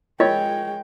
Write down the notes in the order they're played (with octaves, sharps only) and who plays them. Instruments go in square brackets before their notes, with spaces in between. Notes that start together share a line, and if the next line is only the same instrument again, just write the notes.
[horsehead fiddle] G#3 G5 [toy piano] F4 A#4 D#5 [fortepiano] C#5